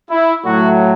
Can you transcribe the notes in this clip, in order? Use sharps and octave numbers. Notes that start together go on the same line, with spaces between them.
E4
A2 F#3 F#4